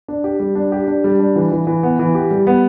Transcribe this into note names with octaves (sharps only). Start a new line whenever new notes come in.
D4
G4
G3
D4
G4
D4
G3
D4
E3
E3
E3
B3
E3
G4
G3
B3